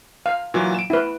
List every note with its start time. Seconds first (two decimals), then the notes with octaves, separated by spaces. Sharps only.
0.26 F5
0.54 A#2 E3 F#3
0.74 D7 E7
0.90 E4 B4